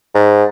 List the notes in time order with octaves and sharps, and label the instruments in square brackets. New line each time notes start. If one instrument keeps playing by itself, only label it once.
[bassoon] G#2